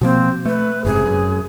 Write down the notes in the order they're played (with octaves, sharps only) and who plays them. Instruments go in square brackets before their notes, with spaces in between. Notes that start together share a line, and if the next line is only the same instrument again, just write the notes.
[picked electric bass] B2 F3 A#3 [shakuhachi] C4
[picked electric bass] A3 [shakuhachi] B4
[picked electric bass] F#1 G#2 C3 [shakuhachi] G#4
[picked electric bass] F#2